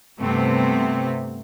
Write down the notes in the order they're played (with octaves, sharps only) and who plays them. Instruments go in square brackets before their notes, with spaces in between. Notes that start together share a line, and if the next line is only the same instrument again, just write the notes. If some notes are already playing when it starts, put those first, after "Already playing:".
[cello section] G2 C3 A3 B3 C4